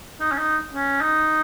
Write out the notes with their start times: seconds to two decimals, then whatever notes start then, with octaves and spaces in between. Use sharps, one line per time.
0.20 D#4
0.32 C#4
0.38 D#4
0.74 C#4
1.01 D#4